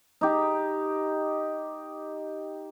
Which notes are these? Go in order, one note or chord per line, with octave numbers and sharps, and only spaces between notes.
D#4 G4